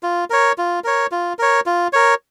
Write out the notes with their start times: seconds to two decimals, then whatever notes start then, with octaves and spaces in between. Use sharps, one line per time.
0.03 F4
0.30 A#4 C#5
0.58 F4
0.84 A#4 C#5
1.12 F4
1.39 A#4 C#5
1.66 F4
1.93 A#4 C#5